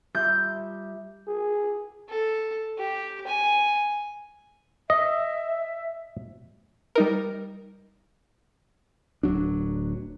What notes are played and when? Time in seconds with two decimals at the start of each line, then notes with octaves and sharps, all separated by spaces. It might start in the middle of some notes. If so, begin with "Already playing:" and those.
0.15 G3 F4 E5 G6
1.28 G#4
2.09 A4
2.78 G4
3.27 G#5
4.90 D#5 E5
6.95 G3 D#4 A#4
9.23 D1 G1 F#3 D4